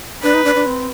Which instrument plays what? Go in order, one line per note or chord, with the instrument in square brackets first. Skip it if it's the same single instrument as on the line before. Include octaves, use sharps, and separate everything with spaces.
[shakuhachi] D4 [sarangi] B4
[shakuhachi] D#4
D4
D4
C4